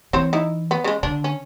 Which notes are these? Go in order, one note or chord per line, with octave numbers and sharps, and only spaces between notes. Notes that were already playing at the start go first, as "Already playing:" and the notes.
E3 C4 C5 C#5
D#4 E4
B3
C#3 G#3
D3 D4
C#4